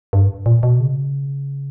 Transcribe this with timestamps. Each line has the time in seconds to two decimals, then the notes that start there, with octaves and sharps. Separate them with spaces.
0.13 G2
0.46 A#2
0.63 B2
0.80 C#3